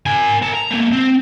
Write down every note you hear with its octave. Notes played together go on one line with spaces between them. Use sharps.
A#4 G#5
A#4 A5
A#5
A3 A#3
C4